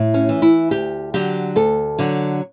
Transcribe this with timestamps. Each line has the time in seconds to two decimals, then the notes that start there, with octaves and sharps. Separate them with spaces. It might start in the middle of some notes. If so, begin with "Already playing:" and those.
Already playing: A2
0.14 C#4
0.29 E3
0.42 E4
0.71 D2 G4
1.14 D3 F#3 G4
1.56 D2 A4
1.98 D3 F#3